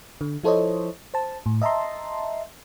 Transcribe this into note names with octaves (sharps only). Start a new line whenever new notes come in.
D3
F3 E4 A4 C5 C#5 D#5
C5 A5
A2
D#5 E5 A5 A#5 C6